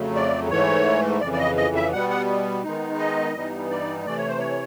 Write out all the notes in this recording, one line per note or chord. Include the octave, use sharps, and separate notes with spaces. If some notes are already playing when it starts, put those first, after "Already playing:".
Already playing: F2 C#3 F#3 A3
D5
G#2 E3 A3 C#5
F2 C#3 E3 D5
D5
D#5
D#5
E5
B2 G3 B3 F#5
F#5
D#3 G#3 B3 D#4
D#5
G2 E3 G3 B3 D#4
D5
C3 E3 A3 D5
C#5
C5
C#5